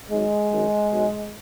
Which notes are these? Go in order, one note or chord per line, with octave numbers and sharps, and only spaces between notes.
G#1 G#2 F#3 G#3
G#1 F#2 D#3 F#3
B1 B2 F#3